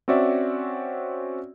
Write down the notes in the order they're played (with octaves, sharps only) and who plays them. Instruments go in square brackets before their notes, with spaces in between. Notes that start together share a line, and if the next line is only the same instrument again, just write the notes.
[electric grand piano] C4 C#4 F#4 D5 E5